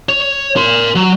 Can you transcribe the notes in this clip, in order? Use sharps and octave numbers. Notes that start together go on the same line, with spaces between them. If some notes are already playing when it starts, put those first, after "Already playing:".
C#5
A#4 C6
F#3